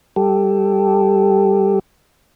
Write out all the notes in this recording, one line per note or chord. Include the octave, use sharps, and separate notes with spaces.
G3 G4 A4